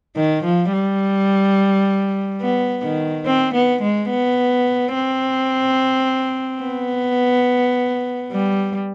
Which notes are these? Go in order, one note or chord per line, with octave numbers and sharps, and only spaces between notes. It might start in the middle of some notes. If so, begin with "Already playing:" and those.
D#3
F3
G3
B3
D#3
C4
B3
G#3
B3
C4
B3
G3